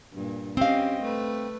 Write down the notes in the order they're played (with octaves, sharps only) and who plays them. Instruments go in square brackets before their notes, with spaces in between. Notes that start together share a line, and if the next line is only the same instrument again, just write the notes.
[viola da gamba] G2 A#2
[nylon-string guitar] C4 F5 [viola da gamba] C#4 G4 D#5
[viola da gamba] A3 B4